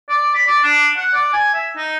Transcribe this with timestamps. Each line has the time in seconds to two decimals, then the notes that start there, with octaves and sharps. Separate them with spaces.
0.09 D5
0.35 B5
0.47 D5
0.64 D4
0.97 F#5
1.14 D5
1.33 G#5
1.54 E5
1.77 D#4